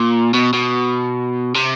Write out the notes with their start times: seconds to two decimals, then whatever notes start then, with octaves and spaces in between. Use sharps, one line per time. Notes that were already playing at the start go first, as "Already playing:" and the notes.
Already playing: A#2
0.34 B2
0.54 B2
1.55 C3